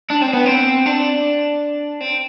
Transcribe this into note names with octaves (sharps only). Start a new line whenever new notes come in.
D4
C4
B3
C4
D4
C4